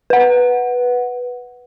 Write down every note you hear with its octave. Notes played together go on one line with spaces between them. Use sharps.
B4 F#5